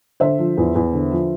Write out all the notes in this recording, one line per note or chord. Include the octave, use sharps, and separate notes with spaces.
D3 C5 E5
F3
E2
E2
D3
F3